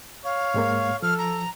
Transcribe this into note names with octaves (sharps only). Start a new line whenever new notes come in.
C#5 F5
G#2 G#3 A#3
F3 A4 F6
A#5